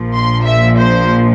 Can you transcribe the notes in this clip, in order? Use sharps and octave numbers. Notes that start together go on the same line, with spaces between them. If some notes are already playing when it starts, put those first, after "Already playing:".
Already playing: A#1 A#2 F3
C6
E5
C5